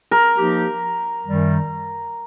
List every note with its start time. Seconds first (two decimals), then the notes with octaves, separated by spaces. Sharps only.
0.11 A#4
0.34 F3 A#3 D#4 G4
1.25 F#2 D#3 G3